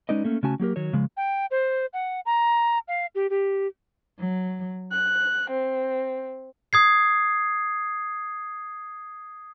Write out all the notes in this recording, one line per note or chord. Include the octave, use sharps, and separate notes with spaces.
G#3 C#4 D#4 B4 D5 D#5
A3 A#3 C#4
C#3 A3 C#4 F#4 G#5 A5
F#3 A#3 G4 A#4
D#3 F#3 C#5
C#3 F3 G#3
G5
C5
F#5
A#5
F5
G4
G4
F#3
F#6
C4
D#6 G#6 C7